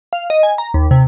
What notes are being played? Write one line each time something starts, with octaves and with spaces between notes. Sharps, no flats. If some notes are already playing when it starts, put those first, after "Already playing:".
F5
D#5
G#5
A#5
D#2
C3